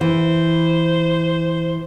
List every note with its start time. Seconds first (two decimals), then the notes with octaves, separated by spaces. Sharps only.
0.01 E3 C5